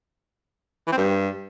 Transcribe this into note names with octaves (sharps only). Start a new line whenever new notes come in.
E3
C4
G2